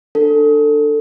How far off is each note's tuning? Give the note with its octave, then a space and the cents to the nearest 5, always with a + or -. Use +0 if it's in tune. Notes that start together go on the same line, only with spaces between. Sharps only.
D4 +15 A4 +20